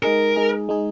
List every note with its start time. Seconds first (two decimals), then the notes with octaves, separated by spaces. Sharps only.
0.03 G#3 D#4 G#4 A#4
0.36 G#3 D#4 G#4
0.69 G#3 D#4 G#4